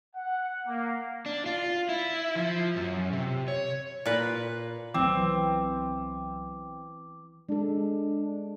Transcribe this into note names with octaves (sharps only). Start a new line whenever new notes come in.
F#5
A#3
D4
F4
E4
F3
F#2
C3
C#5
A#2 B4
C2 E3 F#3 C4 D6
G#3 D4 A4